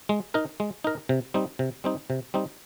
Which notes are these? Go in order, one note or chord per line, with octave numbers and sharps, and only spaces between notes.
G#3
D#4 A#4
G#3
D#4 A#4
C3
G3 C4 D#4
C3
G3 C4 D#4
C3
G3 C4 D#4